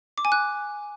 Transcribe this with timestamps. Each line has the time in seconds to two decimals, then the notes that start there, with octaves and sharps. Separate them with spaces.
0.18 D6
0.25 G#5
0.32 F#6